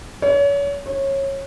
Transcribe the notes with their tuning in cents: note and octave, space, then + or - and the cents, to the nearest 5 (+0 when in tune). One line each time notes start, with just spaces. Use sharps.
C#5 +35
C#5 -20